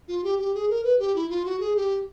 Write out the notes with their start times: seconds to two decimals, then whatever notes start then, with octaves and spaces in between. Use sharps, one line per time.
0.08 F4
0.24 G4
0.39 G4
0.55 G#4
0.70 A#4
0.84 B4
0.99 G4
1.15 E4
1.30 F4
1.45 F#4
1.60 G#4
1.76 G4